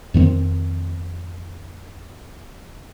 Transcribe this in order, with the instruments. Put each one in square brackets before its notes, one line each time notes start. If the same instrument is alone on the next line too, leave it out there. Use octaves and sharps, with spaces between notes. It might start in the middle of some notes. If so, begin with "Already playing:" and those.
[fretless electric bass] F2 D#3 B3 C4